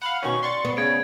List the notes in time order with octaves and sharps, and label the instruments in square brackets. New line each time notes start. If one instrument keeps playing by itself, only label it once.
[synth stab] F5 F#5 [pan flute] B5
[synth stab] B2 D#3 C#4 [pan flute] C#6
[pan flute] D5 [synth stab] C6 C#6 A6
[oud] B3
[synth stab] C#3 [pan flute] D5 [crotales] G#6 D7